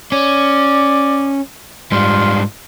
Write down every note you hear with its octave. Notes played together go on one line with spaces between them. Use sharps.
C#4 D5
G#2 G3 F4